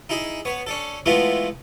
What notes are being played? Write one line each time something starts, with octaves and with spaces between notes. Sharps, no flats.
D#4 E4 G#4
B3 C#5
C#4 D4 A4
E3 G#3 A3 B3 E4 F4